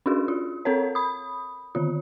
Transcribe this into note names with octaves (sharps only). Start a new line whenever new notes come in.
C#4 D4 F#4 G#4
F4
C4 A4 A#4 C#5
B5 D#6
D3 D#3 F4